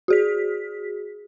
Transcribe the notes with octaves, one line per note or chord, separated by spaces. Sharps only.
F#4 G#4 B6